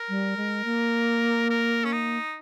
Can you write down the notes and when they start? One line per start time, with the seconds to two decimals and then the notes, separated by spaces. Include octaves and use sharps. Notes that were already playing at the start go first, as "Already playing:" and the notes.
Already playing: A#4
0.09 G3
0.37 G#3
0.65 A#3
1.50 A#4
1.85 C#4
1.92 D#4